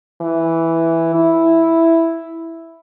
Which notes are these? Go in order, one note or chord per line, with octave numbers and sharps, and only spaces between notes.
E3
E4